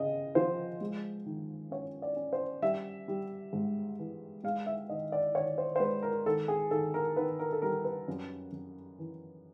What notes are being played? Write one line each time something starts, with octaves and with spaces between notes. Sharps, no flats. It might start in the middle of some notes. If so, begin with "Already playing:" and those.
Already playing: C#3 D#5
F3 C5
G#3
D#3
C#4 C#5
D5
C#4
C5
G3 E5
G3
G#2
E3
G#3 F5
E5
D#3 D#5
D5
D#3 C#5
C5
C5
G#3 B4
A#4
D#3 A4
G#4
D#3 A4
A#4
D#3 B4
A#4
A4
G3 A#4
B4
F#2
F#2
E3